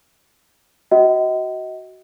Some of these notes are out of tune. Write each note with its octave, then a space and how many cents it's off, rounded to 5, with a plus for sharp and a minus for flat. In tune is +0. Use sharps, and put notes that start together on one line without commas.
F#4 +15 D#5 +30 F#5 +45